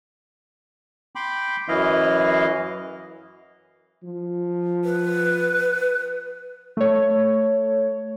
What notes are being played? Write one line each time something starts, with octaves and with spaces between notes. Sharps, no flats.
G5 B5 C6 D6
F#2 E3 E4 D#5 F5
F3
B4
A3 C#5